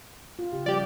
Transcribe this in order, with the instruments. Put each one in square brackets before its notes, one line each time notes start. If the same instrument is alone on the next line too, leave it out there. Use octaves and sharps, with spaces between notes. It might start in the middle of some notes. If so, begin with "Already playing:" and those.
[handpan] F4
C#3 G4
[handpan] F3 G3 [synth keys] G4 D5